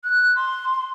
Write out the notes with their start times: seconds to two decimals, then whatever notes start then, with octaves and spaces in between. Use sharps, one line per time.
0.04 F#6
0.36 C6